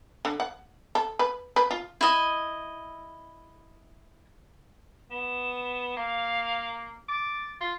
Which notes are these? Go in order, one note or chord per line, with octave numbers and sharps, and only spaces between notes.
D3
F#5
A4
B4
B4
F4
E4 D#5
B3 E7
A#3 F5
D6 A6
F4